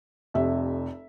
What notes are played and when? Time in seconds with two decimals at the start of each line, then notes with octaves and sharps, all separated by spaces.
0.34 F1 F2 C3 E5